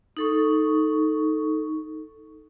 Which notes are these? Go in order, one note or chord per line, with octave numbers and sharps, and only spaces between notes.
D#4 A4 C#6